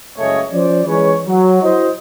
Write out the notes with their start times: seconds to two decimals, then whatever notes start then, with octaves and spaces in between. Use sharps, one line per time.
0.18 F#1 C#2 A3 C#4 C#5 D#5
0.52 F3 C#4 C5 D5
0.87 E3 G#3 C#4 B4 C#5
1.28 F#3
1.62 E4 F#4 C5 D#5